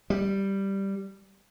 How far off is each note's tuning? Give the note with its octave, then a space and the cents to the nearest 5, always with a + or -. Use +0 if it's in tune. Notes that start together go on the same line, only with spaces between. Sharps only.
G3 +0